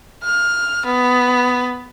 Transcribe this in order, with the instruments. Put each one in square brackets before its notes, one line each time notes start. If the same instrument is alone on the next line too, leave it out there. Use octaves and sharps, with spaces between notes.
[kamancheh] F6
B3